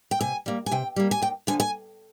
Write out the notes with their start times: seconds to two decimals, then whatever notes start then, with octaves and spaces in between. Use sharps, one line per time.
0.11 G5
0.21 C3 G#5
0.46 G3 A#3
0.66 G#5
0.71 C3 G5
0.96 G3 A#3
1.11 G#5
1.22 D#2 G5
1.47 D3 F3 G#5
1.60 G#5